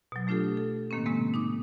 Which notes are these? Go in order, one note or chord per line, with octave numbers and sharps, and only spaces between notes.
B2 F#3
F#3 A3 D4 F4 G4 A4
A4
A2 D#3 A#3 C4 C#4
C3 G#3 A#3 C4
D#4 D6 D#6